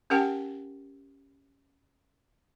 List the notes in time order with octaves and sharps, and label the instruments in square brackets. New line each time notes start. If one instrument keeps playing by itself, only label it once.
[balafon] C#4 G4 A#4 F#5 G5 A5